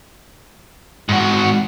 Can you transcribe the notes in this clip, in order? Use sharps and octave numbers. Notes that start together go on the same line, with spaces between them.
G#2 F#4